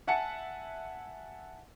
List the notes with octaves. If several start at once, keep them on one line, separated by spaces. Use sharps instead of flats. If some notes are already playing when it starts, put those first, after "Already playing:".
E5 F#5 G#5 A5 C#7